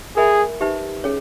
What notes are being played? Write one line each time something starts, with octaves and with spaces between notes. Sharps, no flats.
G#4 A#4 E5 G#5 B5
D#4 G4 B4 E5
C#4 G#4 C#5